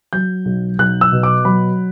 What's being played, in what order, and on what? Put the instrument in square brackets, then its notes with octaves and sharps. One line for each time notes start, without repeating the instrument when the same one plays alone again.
[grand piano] F#3 G6
B1
B1 F#6
E6
B2
D6
F#3 B5